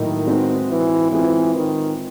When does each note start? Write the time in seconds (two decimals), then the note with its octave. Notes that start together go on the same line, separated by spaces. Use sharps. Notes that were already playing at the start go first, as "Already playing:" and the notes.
Already playing: A2 D#3 F#3 A#3 D#4
0.27 G#3 C4 D#4 F#4 B4
0.70 E3
1.12 E3 G#3 C4 F4 G#4
1.55 D#3